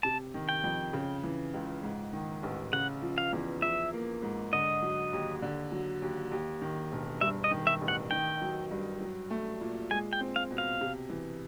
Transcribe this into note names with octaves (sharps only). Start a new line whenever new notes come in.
C3 A5
D#3
G5
F2
C#3
E3
C#2
G#2
D#3
A1
C#3 F#5
F3
F5
E2
F3 E5
A#3
G#2
D3 D#5
F#3
D#2
D3
F#3
D#2
D#2
D#3
E1
G2 E5
D#5
D#3
E5
A1
F#5
D#3 G5
F#3
G2
F#3
A3
A#2
G#3 G#5
G5
C4
F5
B2
F5
C3
E3